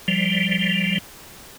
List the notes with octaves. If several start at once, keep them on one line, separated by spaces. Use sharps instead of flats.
F3 G3